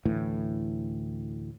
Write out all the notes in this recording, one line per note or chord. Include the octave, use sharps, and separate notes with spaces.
D2 A2 E3